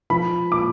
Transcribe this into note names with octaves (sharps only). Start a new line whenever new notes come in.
F3 B5
A#2 D6